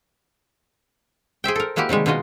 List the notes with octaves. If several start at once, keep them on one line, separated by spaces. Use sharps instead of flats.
G#4 C5 E5 G5
A4 A#4
G#3 A#3 E4 F#4 G4
C3 D#3 G3 G#3
B2 G#3 D#4 F4 F#4 D#5